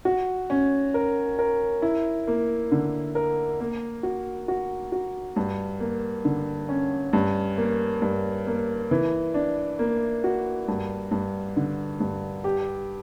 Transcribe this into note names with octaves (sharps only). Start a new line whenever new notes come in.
F#4
C#4
A#4
A#4
E4
A#3
D3
A#4
A#3
F#4
F#4
F#4
G2
A#3
D3
C#4
G2
A#3
G2
A#3
E3
D4
A#3
F#4
G2
G2
D3
G2
G4